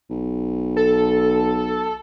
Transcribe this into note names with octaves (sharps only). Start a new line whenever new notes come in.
B1
A4